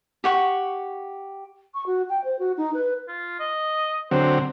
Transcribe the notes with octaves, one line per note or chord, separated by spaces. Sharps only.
G4 F#5 C#6
C#6
F#4
G5
C5
F#4
D#4
B4
F4
D#5
D3 F#3 C4 C5